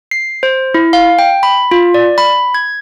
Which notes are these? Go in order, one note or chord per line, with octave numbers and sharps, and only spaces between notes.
C7
C5
E4
F5
G5
B5
F4
D5
B5
G#6